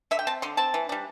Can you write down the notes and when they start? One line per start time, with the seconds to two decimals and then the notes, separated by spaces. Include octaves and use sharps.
0.11 D3 E5
0.19 G5
0.27 C4 A5
0.42 D3 C6
0.57 C4 A5
0.74 E3
0.89 G3 D4